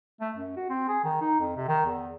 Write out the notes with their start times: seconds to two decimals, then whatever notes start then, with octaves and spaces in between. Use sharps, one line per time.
0.20 A3
0.36 F#2
0.56 F#4
0.69 C4
0.88 G#4
1.04 D#3
1.21 D#4
1.39 F2
1.56 C3
1.68 D#3
1.86 E2